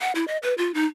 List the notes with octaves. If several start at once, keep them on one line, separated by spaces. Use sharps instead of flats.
F#5
E4
D#5
B4
F4
D#4